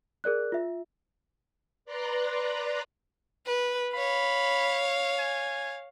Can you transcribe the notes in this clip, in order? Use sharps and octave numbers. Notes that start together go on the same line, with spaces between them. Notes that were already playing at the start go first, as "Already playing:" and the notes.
G#4 A#4 D5 F#6
F4 E5
B4 D5 A#5 C6 F#6
B4
C#5 F5 B5
G#5